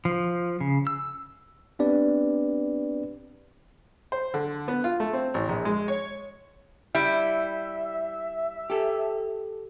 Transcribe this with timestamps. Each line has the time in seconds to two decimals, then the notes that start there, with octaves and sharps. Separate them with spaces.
0.05 F3
0.61 C#3
0.87 E6
1.79 B3 C4 D4 G4 B4 D5
4.12 C5
4.34 D3
4.68 B3
4.84 F4
5.00 A3
5.13 C4
5.34 A1
5.49 A#1
5.65 G#3
5.88 C#5
6.95 G3 E4 E5
8.70 G4 A4